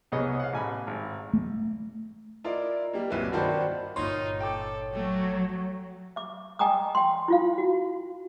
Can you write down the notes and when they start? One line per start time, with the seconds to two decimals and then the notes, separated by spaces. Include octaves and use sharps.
0.12 C2 B3 G#4 C#5 D#5
0.40 F5 F#5
0.53 A1 G#5 B5
0.87 G#1
1.33 A3
2.44 E4 F4 A#4 D5 D#5
2.93 G3 A#3
3.10 C2 A#2 F#3 E4 B4
3.32 G2 D#3 F#4 C5 D5 B5
3.96 G1 A#2 D#4 F4 C#5 C6
4.40 A4 G5 D6
4.94 F#3 A3
6.16 E5 D6
6.59 D#5 G5 G#5 A#5 D6 D#6
6.95 G5 C6
7.28 E4 F4 F5
7.58 F#4